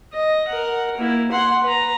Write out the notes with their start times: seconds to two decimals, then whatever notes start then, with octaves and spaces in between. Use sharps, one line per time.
0.13 D#5
0.48 A#4 F#5
0.97 A#3 E4
1.32 F#5 C6
1.63 B4 A#5